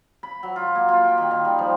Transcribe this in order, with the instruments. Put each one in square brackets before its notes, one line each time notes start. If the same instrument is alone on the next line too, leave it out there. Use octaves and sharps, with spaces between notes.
[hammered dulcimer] B5
F#3
F4
A#3
F4
G5
D#3
D#3
G3
F3